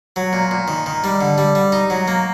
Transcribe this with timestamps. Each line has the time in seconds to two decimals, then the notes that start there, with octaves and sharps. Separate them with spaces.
0.16 F#3
0.33 A#2
0.51 A#2
0.68 D#3
0.86 D#3
1.04 G3
1.21 D3
1.38 G3
1.55 G3
1.72 D#4
1.90 F#3
2.08 A#3